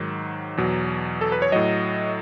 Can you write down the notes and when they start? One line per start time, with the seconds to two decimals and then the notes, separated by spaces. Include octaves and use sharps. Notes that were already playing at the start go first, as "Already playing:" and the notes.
Already playing: G#2 D#3 F#3
0.57 E2 B2 F#3
1.21 A4
1.32 B4
1.42 C#5
1.52 A2 F#3 D#5